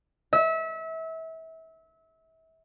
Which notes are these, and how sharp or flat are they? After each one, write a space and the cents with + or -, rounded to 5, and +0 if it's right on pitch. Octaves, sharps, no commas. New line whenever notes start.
E5 -30